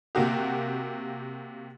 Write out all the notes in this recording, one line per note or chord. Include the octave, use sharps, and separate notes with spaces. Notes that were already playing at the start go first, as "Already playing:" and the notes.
C3 A#3 F#4 G4